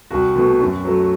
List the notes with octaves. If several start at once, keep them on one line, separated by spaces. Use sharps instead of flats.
C2 F#4
B2 A3
F#2
F#3 A3